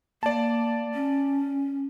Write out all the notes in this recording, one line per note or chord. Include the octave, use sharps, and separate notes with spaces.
A#3 D5 A5
C#4